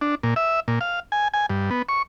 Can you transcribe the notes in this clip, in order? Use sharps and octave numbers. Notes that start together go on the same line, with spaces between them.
D4
A#2
E5
A#2
F5
G#5
G#5
G2
B3
C#6